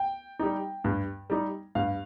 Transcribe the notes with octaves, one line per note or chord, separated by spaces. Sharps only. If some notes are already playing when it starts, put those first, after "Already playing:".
Already playing: G5
G3 D#4
G2
G3 D#4
G2 F5